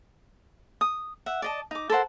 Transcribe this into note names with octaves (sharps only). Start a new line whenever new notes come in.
D#6
E5 F#5
D5 D#5 A5
D#4 D6
A4 A#4 C5 F#5